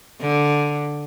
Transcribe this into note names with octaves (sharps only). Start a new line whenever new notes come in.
D3